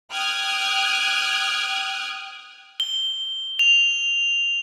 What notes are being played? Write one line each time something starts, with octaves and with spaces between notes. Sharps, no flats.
G5 D#6 F6 F#6 G#6
G7
F7